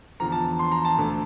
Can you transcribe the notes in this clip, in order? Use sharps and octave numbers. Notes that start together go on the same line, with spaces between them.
E2 D3 F3 A#5
A5
C6
A#5
A5
D2 D3 A3